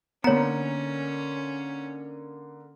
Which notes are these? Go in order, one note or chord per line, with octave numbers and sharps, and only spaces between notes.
D3 A#3 B3 C#4 C#5 A#5 C#7